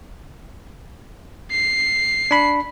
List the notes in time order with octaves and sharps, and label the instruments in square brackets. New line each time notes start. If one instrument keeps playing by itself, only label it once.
[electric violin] C7
[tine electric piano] D4 B5